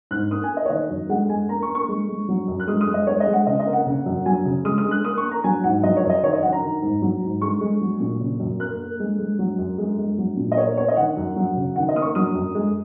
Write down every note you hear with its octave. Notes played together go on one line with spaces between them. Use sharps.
G#2 F#6
A#3 D#6
G#5
A#3
D#5
C#5
D#3 D#5
F#2
G#3 F#5
G#3 G#5
A#3 A#5
C#6
A#3
C#6
G#3
G#3
F#3
F#2
F#6
G#3 D#6
D#6
G#3
D#5
G#3 C#5
D#5
G#3
F#5
C#3 D#5
D#5
A#3
F#5
C#3
F#2
F#3 G#5
C#3
G#3 D#6
D#6
G#3
F#6
A#3 D#6
C#6
A#3
A#5
F#3 G#5
G#2 F#5
F#3 D#5
C#5
F#2
D#5
D#3 C#5
D#5
F#2 F#5
A#5
D#3
G#2
F#3
G#2
G#3 C#6
G#3
F#3
A#2
C#3
F#2
A#3 F#6
A#3
G#3
G#3
F#3
F#2
G#3
G#3
F#3
A#2
D#5
A#3 C#5
A#3 C#5
D#5
D#3 F#5
F#2
F#3
C#3
D#3 F#5
D#5
A#3 D#6
C#6
F#3 D#6
F#2
G#3